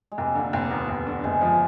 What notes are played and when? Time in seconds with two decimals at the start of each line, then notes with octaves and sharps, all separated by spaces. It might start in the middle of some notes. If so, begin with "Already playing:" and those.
0.12 G#3
0.18 F1 A#3
0.35 D3
0.53 F1
0.65 A#3
0.71 D#2 B3
0.89 F1
1.07 D3
1.24 F#1 G#3
1.42 F3 G#3